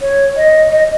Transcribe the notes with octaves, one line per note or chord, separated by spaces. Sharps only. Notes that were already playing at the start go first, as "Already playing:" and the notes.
C#5
D#5
D#5